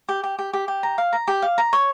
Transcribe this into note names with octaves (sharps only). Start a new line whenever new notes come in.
G4
G4
G4
G4
G4
A#5
F5
A#5
G4
F5
A#5
C#5